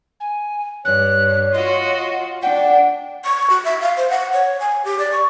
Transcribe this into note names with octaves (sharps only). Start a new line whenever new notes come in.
G#5
G2 C#5 F#6
F4 F#4 D#5
D4 F#5 G5
C#6
F#4
E5
F5
C5
F#5
C#5
G#5
G4
D5
C#6